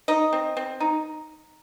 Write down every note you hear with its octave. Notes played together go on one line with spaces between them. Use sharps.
D#4 D#5
C4
C4
D#4